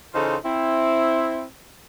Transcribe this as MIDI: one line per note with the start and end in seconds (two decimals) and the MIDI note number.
0.14 0.35 49
0.14 0.35 52
0.14 0.35 63
0.14 0.35 65
0.14 0.35 69
0.14 0.35 72
0.45 1.45 60
0.45 1.45 64